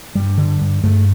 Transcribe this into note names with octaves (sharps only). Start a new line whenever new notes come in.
G2 G3
D3
G2
G2 A3